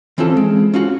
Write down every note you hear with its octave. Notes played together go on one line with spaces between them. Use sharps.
E3 C4 C#4 F4 A4
G#3
C#4 F4 F#4